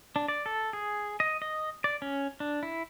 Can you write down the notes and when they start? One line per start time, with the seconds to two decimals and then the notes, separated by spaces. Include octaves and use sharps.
0.16 D4
0.28 D5
0.46 A4
0.73 G#4
1.20 D#5
1.42 D#5
1.84 D5
2.02 C#4
2.40 D4
2.63 E4